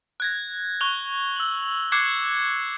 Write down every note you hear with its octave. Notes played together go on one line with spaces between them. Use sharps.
F#6 G#6 A#6
C#6 F#6 F7 G7
E6 F#7
D6 F#6 G#6 C7 C#7